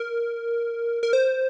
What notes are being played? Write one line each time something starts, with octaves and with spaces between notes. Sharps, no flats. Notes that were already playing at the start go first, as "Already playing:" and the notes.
Already playing: A#4
A#4
C5